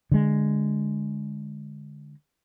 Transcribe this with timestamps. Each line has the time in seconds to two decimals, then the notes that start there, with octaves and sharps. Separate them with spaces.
0.11 D3 G#3